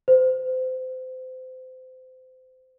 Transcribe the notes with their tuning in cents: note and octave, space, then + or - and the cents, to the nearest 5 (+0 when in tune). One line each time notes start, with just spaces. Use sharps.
C5 -30